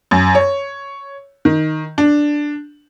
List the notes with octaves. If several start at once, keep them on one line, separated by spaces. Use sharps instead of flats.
F#2
C#5
D#3
D4